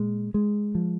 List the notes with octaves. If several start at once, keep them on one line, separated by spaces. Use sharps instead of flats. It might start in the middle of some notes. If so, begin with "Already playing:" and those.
Already playing: A#2 G#3
G#3
F3